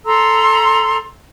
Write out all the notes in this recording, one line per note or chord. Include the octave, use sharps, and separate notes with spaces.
A4 A#5 C6 E6